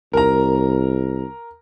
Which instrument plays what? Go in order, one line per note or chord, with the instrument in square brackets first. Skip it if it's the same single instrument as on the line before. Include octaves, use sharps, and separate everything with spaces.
[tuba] C2 [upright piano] A#4 A#5